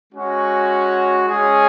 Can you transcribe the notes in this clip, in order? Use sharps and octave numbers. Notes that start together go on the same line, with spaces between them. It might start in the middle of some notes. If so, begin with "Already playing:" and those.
G#3 C#4 F#4
G#3 C#4 G#4